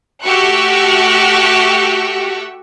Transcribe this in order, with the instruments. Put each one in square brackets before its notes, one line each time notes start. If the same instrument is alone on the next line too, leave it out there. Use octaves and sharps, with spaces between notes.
[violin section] A3 F#4 G4 C#6 E6 F#6